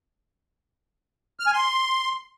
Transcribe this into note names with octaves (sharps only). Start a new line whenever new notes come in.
F6
G#5
C6